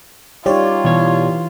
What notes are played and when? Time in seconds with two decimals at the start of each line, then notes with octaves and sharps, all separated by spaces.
0.46 G3 D#4 F4 G4 C#5 D5
0.85 B2 E3 C#5